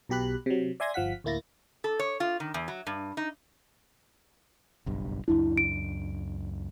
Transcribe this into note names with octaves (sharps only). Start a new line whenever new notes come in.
B1 B2 G4 B5 F#6
C3 F#3
D5 E5 G#5 C6 G#6 A#6
G1 F3 F5 F#5 B6
D2 A2 A#3 E4 A6 A#6
A4
C#5
F4
D#3
E2
F#3
G2
D#4
F#1 B1 G2
C#2 F#2 D4 E4
D7